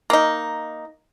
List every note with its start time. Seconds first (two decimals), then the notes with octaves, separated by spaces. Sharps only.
0.10 A#3 D#4